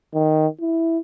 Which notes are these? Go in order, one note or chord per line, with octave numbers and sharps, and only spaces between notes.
D#3
E4